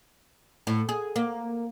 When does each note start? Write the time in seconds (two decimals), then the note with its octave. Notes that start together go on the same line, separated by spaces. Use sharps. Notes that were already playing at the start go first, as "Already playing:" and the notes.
0.67 A2
0.89 G#4
1.16 A#3